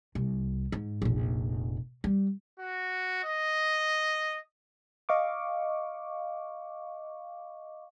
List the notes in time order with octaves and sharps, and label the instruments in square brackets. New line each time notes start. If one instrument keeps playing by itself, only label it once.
[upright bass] C2
G#2
F1 A#1
G3
[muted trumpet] F#4
D#5
[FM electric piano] D#5 F5 C#6 D6